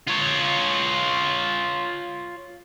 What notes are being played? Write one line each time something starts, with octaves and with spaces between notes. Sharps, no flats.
F4 C#5